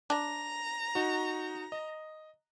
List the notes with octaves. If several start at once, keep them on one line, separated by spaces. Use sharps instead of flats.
D4 A#5
D#4 F#4
D#5